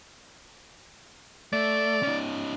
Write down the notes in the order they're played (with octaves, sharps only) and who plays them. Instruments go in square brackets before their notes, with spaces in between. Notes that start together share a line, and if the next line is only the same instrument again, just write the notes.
[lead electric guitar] A3 [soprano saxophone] D5
[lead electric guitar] C#4 D#4